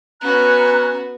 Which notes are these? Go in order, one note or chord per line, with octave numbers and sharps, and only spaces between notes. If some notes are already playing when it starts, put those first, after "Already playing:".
B3 C#4 F#4 A#5 F#6